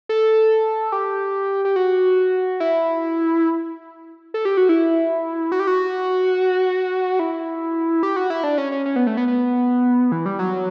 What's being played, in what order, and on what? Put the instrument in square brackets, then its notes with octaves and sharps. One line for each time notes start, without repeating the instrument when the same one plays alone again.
[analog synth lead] A4
G4
G4
F#4
E4
A4
G4
F#4
E4
F#4
G4
F#4
E4
G4
F#4
E4
D4
C#4
C#4
C#4
B3
A3
B3
B3
E3
G3
F#3